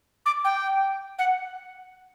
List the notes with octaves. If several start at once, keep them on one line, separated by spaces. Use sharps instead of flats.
D6
G5
F#5